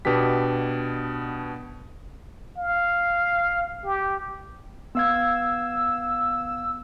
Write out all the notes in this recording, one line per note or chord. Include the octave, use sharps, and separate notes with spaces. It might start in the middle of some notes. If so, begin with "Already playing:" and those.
B2 B3 D4 G4 B6
F5
G4
B3 F5 E6 G#6